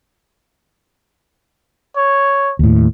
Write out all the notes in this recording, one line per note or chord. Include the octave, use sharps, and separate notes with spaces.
C#5
D#2 A2